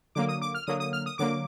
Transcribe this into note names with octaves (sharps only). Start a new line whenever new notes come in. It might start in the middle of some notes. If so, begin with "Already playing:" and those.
D3 F#3 A#3 D6
D#6
D6
F6
D3 F#3 A#3 D#6
D#6
F6
D#6
D3 F#3 A#3 D6